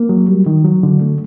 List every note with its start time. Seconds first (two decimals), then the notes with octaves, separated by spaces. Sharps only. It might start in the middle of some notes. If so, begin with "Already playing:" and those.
Already playing: A#3
0.09 F#3
0.28 G3
0.46 D#3
0.65 F#3
0.83 D3
1.01 A3